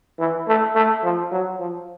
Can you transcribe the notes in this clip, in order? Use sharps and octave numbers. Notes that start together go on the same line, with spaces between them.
E3
A3
A3
F3
F#3
F3